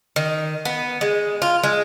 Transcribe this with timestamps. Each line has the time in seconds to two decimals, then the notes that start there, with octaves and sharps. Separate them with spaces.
0.16 D#3
0.65 B3
1.01 G#3
1.42 F4
1.63 G#3